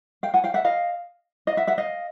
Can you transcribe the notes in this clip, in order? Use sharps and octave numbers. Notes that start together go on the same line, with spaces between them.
F5 G5
F#5 G#5
F5 G5
E5 F#5
D#5 F5
D#5 F5
E5 F#5
E5 F#5
D#5 F5